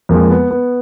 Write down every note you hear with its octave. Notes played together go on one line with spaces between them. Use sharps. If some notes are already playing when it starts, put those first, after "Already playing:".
F2 F3 G#3 A#3
B3
B3